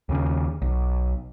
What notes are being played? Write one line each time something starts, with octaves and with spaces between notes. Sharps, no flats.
D#2 C#3
B1